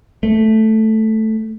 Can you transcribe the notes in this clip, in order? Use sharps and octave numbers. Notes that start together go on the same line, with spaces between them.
A3